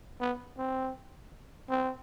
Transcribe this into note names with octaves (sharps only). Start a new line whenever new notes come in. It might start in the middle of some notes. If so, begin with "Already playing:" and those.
B3
C4
C4